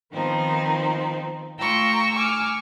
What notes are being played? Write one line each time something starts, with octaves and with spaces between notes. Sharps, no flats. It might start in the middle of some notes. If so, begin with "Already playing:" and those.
D#3 F3 B3 C4 D#4
A3 F4 G5 A#5 C#6 E6
G#5 C#6 D6 E6 F6